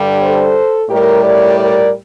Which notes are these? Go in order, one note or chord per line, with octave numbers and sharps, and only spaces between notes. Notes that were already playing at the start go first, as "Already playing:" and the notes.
Already playing: G2 D3 G3
A4 C5
A2 G3 G4 A#4
A#4 D5
A#4 D5